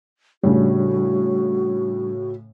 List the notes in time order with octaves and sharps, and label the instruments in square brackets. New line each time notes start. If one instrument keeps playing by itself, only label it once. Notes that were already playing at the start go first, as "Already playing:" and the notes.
[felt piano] A2 C#3 [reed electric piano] G3 D4 [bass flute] F#4